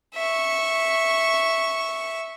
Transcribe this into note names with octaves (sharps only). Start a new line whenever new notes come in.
E5 C#6